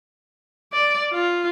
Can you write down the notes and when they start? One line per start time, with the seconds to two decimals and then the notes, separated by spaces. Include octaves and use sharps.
0.73 D5
1.12 F4